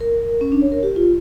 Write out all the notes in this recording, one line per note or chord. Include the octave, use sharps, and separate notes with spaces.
A#4
C#4
D4
C#5
A#4
G4
F4